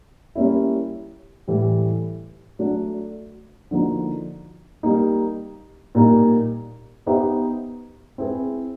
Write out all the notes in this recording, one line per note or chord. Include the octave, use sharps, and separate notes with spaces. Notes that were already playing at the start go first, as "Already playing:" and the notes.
G3 A#3 C#4 E4
A2 E3 G3
F#3 A3 D4
D3 F3 A#3 D#4 F#4
G3 A#3 D#4
A#2 G3 A#3 D#4
B3 D#4 G4 C5 E5
C4 E4 G#4 B4